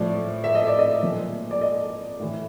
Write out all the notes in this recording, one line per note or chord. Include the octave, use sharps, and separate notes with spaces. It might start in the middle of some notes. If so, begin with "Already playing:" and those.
Already playing: A2 F3 D5
E5
D#5
D5
D#5
A#2 F3
D5
D#5
A2 E3